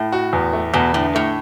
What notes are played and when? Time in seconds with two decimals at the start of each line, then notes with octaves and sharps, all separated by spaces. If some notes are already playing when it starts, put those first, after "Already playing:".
Already playing: A2
0.12 F#4
0.33 E2
0.53 A3
0.74 E2 B2
0.94 A2 D3
1.15 A2 A3